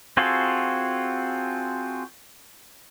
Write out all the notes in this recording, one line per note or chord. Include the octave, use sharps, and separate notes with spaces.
C4 F4 F#4 G#4 A4